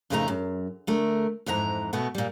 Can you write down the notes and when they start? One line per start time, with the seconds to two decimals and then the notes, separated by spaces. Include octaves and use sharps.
0.10 F2 A#2 C#3 A3 D#4 A#5
0.28 F#2
0.87 D3 A3 A#4
1.46 F2 G#2 E3 A#5
1.93 B2 A3 B3
2.15 A#2 G3